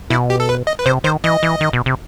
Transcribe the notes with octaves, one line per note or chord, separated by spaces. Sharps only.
B2 E4
G4
A4
B4
D#5
B4
C3 C5
D#3 C5
E3 D#5
E3
D#3
B2
C3